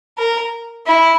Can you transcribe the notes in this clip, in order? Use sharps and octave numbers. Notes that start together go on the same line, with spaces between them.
A#4
E4